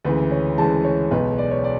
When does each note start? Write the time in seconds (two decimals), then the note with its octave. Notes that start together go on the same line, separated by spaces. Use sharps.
0.05 D2 C#3 E3 G#3 B4
0.31 C#5
0.58 D2 C#3 E3 G#3 A5
0.85 C#5
1.11 B1 B2 G#3 B4
1.38 D5
1.51 C#5
1.64 D5